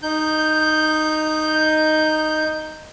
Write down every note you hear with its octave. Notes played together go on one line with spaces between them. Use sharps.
D#4 G6